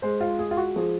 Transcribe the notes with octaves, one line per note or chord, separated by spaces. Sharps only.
G#3 C5
F4
G#3 G#4
F4
F#4
F3 G#4